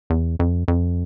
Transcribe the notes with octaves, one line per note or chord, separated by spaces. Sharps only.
E2
F2
F2